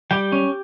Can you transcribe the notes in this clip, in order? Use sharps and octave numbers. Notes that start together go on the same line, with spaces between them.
G3 G4 G5
C#4